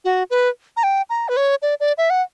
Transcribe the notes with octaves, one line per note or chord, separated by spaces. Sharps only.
F#4
B4
A#5
G5
A#5
B4
C#5
D5
D5
E5
F#5